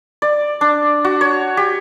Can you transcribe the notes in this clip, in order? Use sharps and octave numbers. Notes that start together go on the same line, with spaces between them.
D5
D4
F#4
C#5
G4